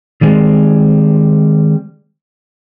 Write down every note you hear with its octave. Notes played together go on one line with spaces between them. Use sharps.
D#3 G3 G#3 C4